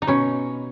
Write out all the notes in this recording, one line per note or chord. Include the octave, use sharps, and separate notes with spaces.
D#4
B2 C#4